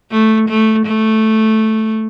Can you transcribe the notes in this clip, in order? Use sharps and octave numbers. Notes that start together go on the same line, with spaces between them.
A3
A3
A3